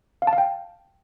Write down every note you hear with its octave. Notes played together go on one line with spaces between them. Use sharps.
F5
A5
F5
G5